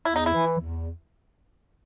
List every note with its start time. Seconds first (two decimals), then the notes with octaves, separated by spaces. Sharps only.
0.05 E2 E4
0.16 D#4
0.26 E4
0.33 E3
0.59 E2